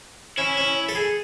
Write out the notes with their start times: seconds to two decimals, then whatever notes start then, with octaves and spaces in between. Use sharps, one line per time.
0.38 C#4 E4
0.57 C#4
0.89 A4
0.95 G#4